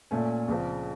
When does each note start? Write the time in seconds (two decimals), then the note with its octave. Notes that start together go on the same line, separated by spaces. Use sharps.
0.11 A#2 A3 C#4
0.48 C#2 C#3 F3 C4